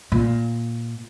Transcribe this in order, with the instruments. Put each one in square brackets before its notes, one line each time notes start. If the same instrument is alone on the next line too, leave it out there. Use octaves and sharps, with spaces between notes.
[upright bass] A#2